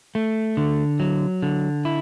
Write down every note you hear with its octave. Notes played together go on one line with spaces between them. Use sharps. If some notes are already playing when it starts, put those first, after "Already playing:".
A3
D3
F#3
D3
E4